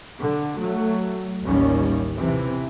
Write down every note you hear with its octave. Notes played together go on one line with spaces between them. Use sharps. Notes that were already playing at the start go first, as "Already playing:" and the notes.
D3
F#3 A3
A1 D#2 D#3 G3 C#4
C3 E3